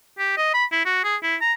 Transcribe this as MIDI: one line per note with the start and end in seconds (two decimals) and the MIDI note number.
0.18 0.35 67
0.37 0.52 75
0.54 0.65 83
0.72 0.81 64
0.85 1.02 66
1.04 1.16 68
1.23 1.36 64
1.41 1.53 82